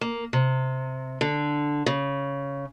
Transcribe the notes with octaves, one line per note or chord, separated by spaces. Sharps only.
A#3
C3
D3
C#3